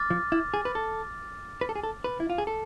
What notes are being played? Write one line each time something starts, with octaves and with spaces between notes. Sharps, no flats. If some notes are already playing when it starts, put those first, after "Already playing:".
Already playing: D6 F6 A6
F3
E4
G#4
B4
A4
B4
A4
G#4
A4
B4
E4
F4
G#4
A4